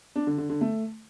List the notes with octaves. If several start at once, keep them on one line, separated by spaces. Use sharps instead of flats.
D4
D3
D3
D3
A3